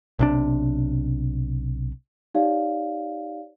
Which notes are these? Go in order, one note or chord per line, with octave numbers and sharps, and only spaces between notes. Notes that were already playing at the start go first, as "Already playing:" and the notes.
B1 C3 D4
D#4 G4 C#5 D5 F5